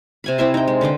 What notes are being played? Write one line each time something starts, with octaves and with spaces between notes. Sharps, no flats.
C3 G#5 B5
C4 E4 E5 C6
D#4 G5
G#3
D3 B4 C5 G5